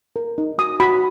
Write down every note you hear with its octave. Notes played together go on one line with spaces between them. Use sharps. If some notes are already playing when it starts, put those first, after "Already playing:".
A#4
D#4
F#4 D#6
F#4 B5